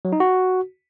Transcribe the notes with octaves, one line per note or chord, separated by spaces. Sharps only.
F#3
D#4
F#4